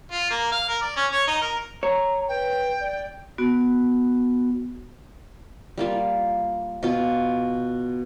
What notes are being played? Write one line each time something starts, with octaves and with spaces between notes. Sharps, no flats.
F4
A#3
F5
A#4
D5
C#4
C#5
D#4
A#4
C#5 A#5
B4 G5
D5
B3 F#4
G3 A#3 F4
B2 F4